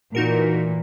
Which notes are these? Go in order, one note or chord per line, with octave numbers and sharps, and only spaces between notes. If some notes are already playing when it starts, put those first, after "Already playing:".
A#2 E3 D#4 F#4 A#4